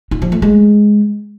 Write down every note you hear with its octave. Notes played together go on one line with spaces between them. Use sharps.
D#4
F3
A3
G#3